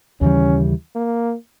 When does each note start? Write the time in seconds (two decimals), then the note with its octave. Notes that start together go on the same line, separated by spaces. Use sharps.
0.21 D#2 C#3 E3 G3 C#4
0.95 A#3